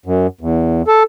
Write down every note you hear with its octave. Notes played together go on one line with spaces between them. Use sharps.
F#2
E2
A4